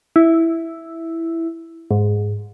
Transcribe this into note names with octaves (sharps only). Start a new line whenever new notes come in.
E4
G#2